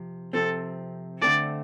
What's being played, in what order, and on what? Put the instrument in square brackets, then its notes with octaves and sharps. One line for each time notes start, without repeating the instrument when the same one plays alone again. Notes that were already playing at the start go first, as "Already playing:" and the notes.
Already playing: [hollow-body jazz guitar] C3 F3
[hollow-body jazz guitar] C3 F3 C4 [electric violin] A4
[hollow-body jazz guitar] D3 A3 C4 A4 [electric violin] D5